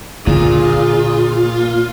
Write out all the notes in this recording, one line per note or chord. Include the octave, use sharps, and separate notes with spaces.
A#2 D3 F4 G#4